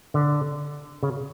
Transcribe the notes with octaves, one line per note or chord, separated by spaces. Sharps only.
D3
C#3